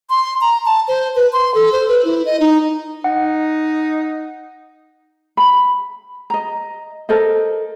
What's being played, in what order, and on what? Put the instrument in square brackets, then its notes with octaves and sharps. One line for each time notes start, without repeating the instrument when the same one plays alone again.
[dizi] C6
A#5
A5
C5
B4
C6
A4
C5
B4
E4
D#5
D#4
[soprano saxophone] D#4 [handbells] F#5
[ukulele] B5
D#5 A#5
A4 A#4 C5 D#5